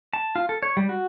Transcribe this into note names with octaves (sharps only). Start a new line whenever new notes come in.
A5
F4
A4
C#5
G3
F#4